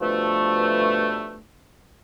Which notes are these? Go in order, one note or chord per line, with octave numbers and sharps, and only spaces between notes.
G2 B2 F3 A3